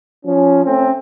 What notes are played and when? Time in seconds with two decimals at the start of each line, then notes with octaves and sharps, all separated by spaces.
0.25 F3 C#4
0.64 A3 C4 C#4